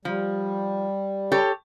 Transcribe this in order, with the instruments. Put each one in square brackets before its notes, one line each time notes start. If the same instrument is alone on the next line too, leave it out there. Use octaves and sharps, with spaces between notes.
[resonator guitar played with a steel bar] F3 [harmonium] G3
[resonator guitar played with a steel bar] G4 A4 C#5